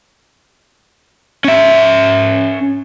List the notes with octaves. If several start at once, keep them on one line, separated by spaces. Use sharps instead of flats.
C#4 E5